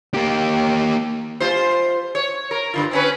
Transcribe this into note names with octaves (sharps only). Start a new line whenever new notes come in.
A#3 G4
G3 F4 C5
C#5
A#4
G2 D3 F4
C4 C#4 B4